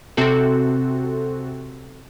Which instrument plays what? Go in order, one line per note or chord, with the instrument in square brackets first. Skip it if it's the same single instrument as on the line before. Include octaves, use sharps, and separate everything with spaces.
[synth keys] C3 C4 F#4 A4